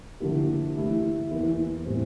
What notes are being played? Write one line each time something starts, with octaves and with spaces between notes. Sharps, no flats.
D3 F3 A#3 E4 G4
E3 A3 E4 G4
E2 E3 A#3 E4
A2 G3 C4